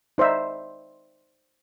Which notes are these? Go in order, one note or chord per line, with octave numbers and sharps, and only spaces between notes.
D#4 C5 D5 E5